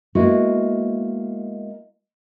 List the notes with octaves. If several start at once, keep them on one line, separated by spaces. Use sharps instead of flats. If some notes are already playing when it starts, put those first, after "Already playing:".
G#3 A#3 B3 E4 F#4